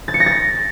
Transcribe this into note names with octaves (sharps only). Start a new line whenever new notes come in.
A6
C#7
A#6
A6